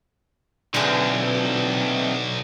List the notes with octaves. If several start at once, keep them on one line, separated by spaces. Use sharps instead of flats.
B1 D3 E3 C4 G#4